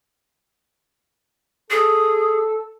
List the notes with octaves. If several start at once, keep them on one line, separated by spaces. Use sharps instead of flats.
G#4 A4